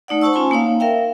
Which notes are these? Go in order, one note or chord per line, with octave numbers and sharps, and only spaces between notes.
A3 D#4 D5 F#5
C5 F#5 A5 C#6 E6
C#4 F4 G#5 A5 C6
A#3 D#4 C#5 F5
A#4 E5 F5 G5